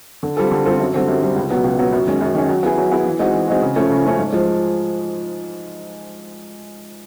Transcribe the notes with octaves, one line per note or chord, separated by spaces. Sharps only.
D3
G3 C4 F4 A4
D3
G3 C4 F4 A4
F#2
D3 G3 C4
F#2
D3 G3 C4
C#2
B2 F#3 B3
C#2
B2 F#3 B3
F#2
D#3 G#3 C#4
F#2
D#3 G#3 C#4
F#3
B3 E4 G#4
F#3
B3 E4 G#4
E3
G#3 C4 D#4 F#4
E3
G#3 C4 D#4 F#4
C#3
F3 A3 C#4
C#3
F3 A3 C#4
G#2
F3 G#3